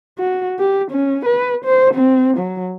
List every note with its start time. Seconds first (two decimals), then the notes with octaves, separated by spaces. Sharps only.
0.19 F#4
0.59 G4
0.91 C#4
1.26 B4
1.65 C5
1.94 C4
2.37 F#3